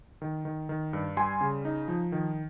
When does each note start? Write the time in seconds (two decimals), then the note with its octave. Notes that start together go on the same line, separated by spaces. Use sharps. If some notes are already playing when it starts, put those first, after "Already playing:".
0.22 D#3
0.45 D#3
0.69 D#3
0.93 G2
1.17 G3 G#5 C6
1.41 C#3
1.65 D#4
1.88 F3
2.12 D#3